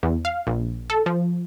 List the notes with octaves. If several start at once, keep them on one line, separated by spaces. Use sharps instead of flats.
E2
F5
A#1
A4
F3